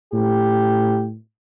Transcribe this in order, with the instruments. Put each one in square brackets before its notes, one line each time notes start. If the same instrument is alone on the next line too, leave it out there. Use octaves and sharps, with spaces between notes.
[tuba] A2 [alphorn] G4